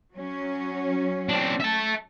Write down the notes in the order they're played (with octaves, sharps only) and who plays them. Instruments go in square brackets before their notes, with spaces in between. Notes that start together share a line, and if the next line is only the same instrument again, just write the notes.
[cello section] F#3 C#4
[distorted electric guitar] C4 D4
E5 A5